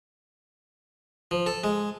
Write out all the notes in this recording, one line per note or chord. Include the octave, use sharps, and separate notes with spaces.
F3
A4
G#3